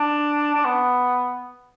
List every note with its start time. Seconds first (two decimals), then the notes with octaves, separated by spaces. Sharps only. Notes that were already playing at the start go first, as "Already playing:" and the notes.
Already playing: D4
0.55 D4
0.65 B3